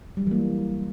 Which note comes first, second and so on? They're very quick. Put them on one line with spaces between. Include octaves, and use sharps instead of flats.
G3 F#3 E3 A#3